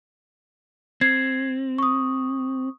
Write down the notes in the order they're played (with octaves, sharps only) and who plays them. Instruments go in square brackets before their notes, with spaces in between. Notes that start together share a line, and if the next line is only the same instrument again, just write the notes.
[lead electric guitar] C4 [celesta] G#6 C7
[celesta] C#6 D#6